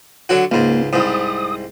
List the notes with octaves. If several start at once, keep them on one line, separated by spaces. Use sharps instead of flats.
D3 F#3 F#4
C#2 G#2 A#3
C2 G#2 D#6